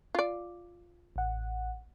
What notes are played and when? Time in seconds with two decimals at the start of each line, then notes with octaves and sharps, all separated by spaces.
0.15 F4 D5
1.16 A1 F#5